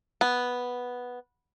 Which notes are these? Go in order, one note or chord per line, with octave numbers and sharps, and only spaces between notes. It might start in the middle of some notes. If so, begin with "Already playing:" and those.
B3